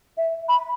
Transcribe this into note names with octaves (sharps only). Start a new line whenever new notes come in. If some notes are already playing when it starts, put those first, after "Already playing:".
E5
B5